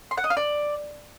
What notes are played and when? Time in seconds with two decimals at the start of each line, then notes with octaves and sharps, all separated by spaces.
0.11 C6
0.17 F#5
0.24 D#5
0.30 F5
0.37 D5